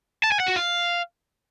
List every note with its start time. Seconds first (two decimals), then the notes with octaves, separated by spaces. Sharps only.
0.24 A5
0.32 G#5
0.40 F#5
0.48 F#4
0.56 F5